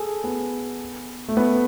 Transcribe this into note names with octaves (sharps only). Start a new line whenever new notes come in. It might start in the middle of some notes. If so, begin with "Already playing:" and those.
Already playing: G#4 A4
B3
A3
B3